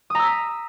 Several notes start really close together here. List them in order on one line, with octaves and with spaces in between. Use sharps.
D#6 A#5 E6 B6